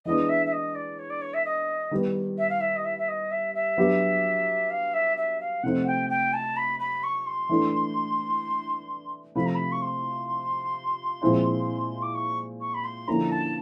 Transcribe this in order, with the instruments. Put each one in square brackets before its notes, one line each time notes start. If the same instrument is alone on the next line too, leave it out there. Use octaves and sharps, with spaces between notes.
[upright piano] E3 G#3 B3 D4 [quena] D#5
[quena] E5
E5
D#5
D5
C#5
D5
C#5
E5
D#5
[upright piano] D#3 G3 B3
[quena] E5
F5
E5
D#5
E5
E5
D#5
E5
E5
[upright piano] F#3 B3 D4 G4
[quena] F5
E5
E5
F5
[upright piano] C3 F3 A3 C4 D#4 [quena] F#5
[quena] G5
G5
A5
B5
B5
C#6
C6
[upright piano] E3 A3 D4
[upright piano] C3 F3 A3 [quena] B5
[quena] A#5
B5
C#6
C6
[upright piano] A#2 F3 G#3 C4 E4
[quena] D6
C#6
C#6
B5
C6
[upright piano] D3 F3 A#3 C#4 E4 [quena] A#5
[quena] A5